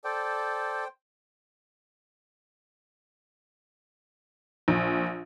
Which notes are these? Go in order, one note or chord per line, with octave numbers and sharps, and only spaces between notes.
A4 C5 D5 G5
A#1